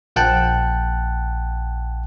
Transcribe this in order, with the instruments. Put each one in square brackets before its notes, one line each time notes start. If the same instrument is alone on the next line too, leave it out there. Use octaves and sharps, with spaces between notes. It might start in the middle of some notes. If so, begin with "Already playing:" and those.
[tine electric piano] A#1 F#5 G5 A5 F#6